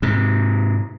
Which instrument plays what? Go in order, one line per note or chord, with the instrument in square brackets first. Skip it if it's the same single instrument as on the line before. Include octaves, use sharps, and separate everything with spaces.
[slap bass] G#2 C3